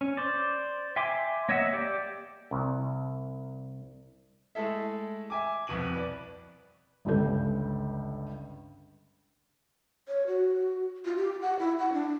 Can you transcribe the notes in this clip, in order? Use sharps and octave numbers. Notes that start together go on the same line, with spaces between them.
C#4
C5 D5
E5 G5 G#5 C6 D6
A#3 C#5 D#5 E5 F#5
G4 D5
C2
G#3 A3 E4 A4 E5
E5 G#5 D6
C2 F2 B2 D#7 F#7
B4 D5
G1 C#2 G2 C#3 A4 G6
C#5
F#4
F4
G4
F#5
E4
F#5
D4